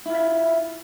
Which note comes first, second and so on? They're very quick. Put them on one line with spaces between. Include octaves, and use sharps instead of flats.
E4 F4 E5